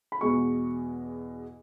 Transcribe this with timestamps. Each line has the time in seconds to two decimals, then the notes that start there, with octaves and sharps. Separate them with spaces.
0.12 B5
0.21 E2 B2 G#3 C#6